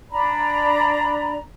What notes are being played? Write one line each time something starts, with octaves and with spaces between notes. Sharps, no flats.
D4 D5 A#5 B5